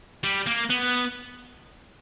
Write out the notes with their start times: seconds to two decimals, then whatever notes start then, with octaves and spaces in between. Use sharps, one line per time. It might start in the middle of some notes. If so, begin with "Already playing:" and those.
0.24 G3
0.46 A#3
0.70 B3